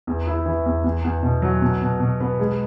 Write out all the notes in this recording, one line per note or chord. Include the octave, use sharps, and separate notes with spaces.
E2
E4
E3
E2
E2
E2
B2
F#3
B2
B2
B2
B3
G#3